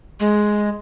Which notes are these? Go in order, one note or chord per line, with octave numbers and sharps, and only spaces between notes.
G#3